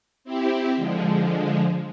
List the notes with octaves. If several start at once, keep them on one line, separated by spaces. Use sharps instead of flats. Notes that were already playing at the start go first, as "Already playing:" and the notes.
C4 E4 G4
D3 F3 G#3